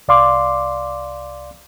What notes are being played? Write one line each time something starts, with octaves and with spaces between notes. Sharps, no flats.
C2 D5 F5 C6 D6